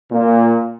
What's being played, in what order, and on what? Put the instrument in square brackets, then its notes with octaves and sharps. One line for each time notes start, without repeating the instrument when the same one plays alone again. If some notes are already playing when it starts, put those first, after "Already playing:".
[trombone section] A#2